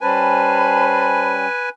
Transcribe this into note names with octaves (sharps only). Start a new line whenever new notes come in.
G3 C#4 B4 C5 G#5 A5 B5